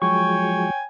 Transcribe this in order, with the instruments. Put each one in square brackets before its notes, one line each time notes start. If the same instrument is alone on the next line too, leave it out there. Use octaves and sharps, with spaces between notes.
[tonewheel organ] F3 F#3 G#3 [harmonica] C#5 G5 G#5 [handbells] C#6